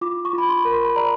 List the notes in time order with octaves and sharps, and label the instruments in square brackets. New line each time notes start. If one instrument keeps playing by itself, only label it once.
[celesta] F4 D6
C#6
F4 B5
C6
A#4
C6
B5
D5 A#5